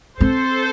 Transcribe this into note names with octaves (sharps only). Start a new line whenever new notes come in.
C4 A4 C5